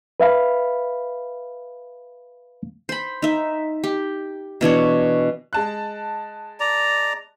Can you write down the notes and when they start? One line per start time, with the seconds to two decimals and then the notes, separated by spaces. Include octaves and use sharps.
0.20 B4 E5 F5 B5
2.89 C5 B5
3.22 D#4 E5
3.84 G4
4.61 B2 E3 D4 C#5
5.53 G#3 A5 F#6
6.60 D5 A#5